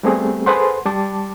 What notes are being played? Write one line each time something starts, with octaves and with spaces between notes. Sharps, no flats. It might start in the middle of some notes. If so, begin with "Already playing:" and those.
G3 A3 B3 C4 G4 G#4
G#4 A4 B4 C5 F#5 C6
G3 A5 D6